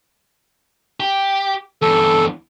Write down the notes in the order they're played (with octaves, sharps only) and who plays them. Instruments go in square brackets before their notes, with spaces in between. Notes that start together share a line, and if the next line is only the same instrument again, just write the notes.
[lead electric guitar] G4
[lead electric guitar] E2 G2 [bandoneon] A4